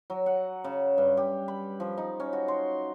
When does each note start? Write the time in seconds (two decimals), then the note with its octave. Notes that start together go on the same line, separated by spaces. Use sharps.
0.10 F#3
0.26 F#5
0.64 C#3
0.98 G2
1.17 G4
1.48 B5
1.80 F3
1.98 D#4
2.20 C#4
2.33 F#4
2.48 C6